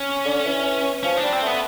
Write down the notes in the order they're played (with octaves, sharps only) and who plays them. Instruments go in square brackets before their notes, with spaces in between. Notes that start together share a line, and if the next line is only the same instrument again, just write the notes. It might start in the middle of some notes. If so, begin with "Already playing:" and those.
Already playing: [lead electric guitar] C#4
[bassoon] D3
E3
[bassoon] F3 [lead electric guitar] C#4
[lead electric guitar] D4
[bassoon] G3
[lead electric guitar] C4
[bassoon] A3 [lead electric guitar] B3